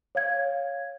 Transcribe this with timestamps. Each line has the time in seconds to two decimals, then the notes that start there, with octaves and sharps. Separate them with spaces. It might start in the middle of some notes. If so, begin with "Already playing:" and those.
0.15 C#5 F5 G#6